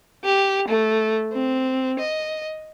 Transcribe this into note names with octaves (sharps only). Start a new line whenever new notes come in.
G4
A3
C4
D#5